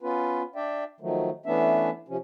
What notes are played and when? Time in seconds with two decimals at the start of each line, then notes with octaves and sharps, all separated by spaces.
0.02 B3 C#4 F4 B4
0.55 D4 D5 E5 G5
1.00 D#3 F3 F#3 A3
1.46 E3 A3 B3 C#4 D4 E5
2.08 C3 F3 C#4